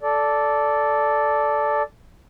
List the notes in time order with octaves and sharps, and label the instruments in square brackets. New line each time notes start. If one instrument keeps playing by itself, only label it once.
[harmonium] A4 D5